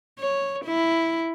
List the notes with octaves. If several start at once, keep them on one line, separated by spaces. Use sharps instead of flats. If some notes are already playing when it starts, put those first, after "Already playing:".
C#5
E4